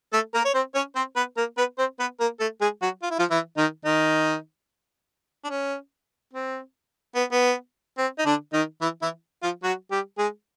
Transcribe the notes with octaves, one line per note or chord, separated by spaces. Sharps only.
A3 A4
A#3 A#4
C#5
C4 C5
C#4 C#5
C4 C5
B3 B4
A#3 A#4
B3 B4
C4 C5
B3 B4
A#3 A#4
A3 A4
G#3 G#4
F#3 F#4
F4
E4
F3 F4
E3 E4
D#3 D#4
D#3 D#4
D4
C#4
C4
B3
B3
C4
D#4
D3 D4
D#3 D#4
E3 E4
E3 E4
F3 F4
F#3 F#4
G3 G4
G#3 G#4